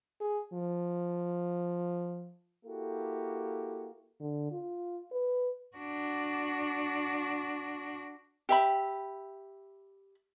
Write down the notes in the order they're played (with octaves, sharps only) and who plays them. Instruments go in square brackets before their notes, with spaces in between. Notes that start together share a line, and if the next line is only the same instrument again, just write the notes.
[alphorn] G#4
F3
[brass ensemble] A#3 E4 F#4 G4 A4
[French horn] D3
F4
B4
[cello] D4 F#4
[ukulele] G4 E5 B5